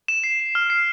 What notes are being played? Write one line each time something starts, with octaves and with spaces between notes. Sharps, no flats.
E7
C7
E7
F6
C7